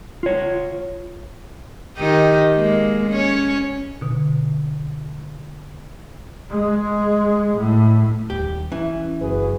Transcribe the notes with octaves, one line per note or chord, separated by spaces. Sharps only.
F4 C#5
D#3 D#4 G4
G#3 A#3
C#4 C#5
B2 D3
G#3
A2
D#1 G4
E3 C#4
F#1 F#4 G#4 B4